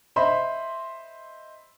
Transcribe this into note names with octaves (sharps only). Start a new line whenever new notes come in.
C5 D#5 E5 B5 C6